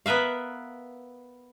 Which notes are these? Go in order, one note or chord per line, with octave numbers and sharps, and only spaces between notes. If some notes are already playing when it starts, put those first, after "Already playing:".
B3 A#4 B4 E5 F5